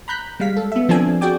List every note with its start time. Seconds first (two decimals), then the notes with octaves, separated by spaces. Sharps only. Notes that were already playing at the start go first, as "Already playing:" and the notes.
0.08 A#5 B5 F#6 G6 B6
0.40 G3 G#3 F5 B6
0.57 A4
0.72 B3 E5
0.89 F3 C4 D4 A4 G#5
1.21 F#4 G#4 D5 G5 D6